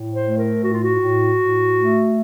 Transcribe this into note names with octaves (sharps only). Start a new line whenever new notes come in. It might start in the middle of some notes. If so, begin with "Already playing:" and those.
Already playing: A2
C5
A3
A#4
A2 F#4
F4
F#4
A2
A2
A3